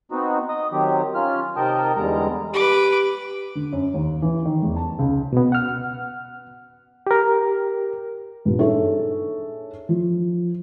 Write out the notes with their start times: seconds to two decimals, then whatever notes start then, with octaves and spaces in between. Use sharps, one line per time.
0.11 B3 C4 D#4 F#4
0.49 D#5 D#6
0.72 D#3 F#3 C4 G4
1.15 C#4 F4 F6
1.56 C3 D#3 A#4 D#5 G5 A5
1.97 E2 D3 G3 G#3 A#5
2.54 G4 B4 D6
3.55 D3
3.72 F#2
3.94 D#2
4.22 E3
4.45 D#3
4.63 E2
4.76 A5
4.99 C#2
5.33 B2 B3
5.52 F#5 F6
7.07 G4 A#4
8.45 A#1 G2
8.59 D4 D#4 G#4 A4 C#5 E5
9.89 F3